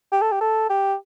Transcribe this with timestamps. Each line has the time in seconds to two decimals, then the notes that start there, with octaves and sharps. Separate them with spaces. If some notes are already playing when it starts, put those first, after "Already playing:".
0.12 G4
0.21 A4
0.32 G4
0.41 A4
0.70 G4